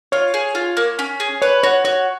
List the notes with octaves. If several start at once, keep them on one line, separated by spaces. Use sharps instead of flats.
F4 C#5
G#4
F4
A#3
C#4
G#4
B4 C#5
F#4 C#5
F#4 C#5